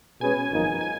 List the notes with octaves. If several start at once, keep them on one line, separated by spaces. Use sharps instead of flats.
B2 G#3 C#4 G#4 B4 G#5
G#1 F#2 F3 A#3 D#4
G#5